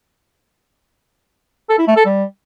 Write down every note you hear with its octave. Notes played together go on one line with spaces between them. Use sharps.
A4
E4
A3
A4
G3